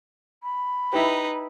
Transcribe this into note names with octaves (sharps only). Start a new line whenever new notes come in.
B5
D#4 E4 G4 B4